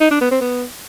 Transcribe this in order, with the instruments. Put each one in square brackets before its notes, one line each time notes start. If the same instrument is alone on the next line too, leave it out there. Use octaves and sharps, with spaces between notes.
[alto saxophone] D#4
D4
B3
C4
B3